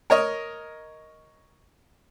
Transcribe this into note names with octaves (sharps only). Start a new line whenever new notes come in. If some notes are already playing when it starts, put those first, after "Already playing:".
A#4 C#5 D#5